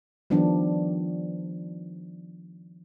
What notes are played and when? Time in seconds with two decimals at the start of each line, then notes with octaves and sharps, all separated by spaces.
0.30 D#3 F3 G3 B3 D4